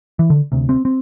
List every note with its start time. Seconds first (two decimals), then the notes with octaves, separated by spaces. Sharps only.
0.19 E3
0.30 D3
0.52 D2 C3
0.69 C4
0.85 C4